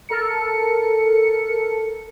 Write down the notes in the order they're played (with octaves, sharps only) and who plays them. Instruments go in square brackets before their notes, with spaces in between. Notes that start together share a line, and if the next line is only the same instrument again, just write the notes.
[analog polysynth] A4 A#4 C#7